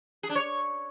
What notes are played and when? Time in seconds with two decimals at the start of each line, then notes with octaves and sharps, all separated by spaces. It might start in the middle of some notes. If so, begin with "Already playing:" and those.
0.23 G#4
0.29 D4
0.35 C#5